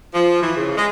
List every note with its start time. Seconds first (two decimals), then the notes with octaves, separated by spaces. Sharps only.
0.14 F3
0.42 E3
0.56 C#3
0.77 G#3